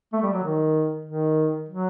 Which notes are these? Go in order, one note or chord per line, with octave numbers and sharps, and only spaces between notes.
A3
G3
F#3
D#3
D#3
F#3